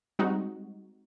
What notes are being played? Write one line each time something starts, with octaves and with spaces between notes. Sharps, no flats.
G3 G#3 C4 D#4 F#4